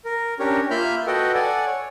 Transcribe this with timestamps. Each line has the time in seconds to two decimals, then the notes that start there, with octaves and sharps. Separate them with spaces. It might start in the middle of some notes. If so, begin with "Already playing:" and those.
0.05 A#4
0.39 C#4 D4 G4 A#4 C#5
0.71 A#3 F4 E5 B5 F6 G6
1.07 F#4 A4 B4 D#5 F#5 G5
1.34 A4 D5 F#5 G#5
1.67 C#5